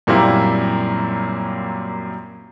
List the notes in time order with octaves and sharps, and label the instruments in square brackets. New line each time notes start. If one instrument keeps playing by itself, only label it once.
[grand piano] F#2 A#2 G3 A#3 C4 E4